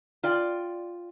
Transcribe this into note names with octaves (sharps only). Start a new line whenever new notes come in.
F4 D5 G5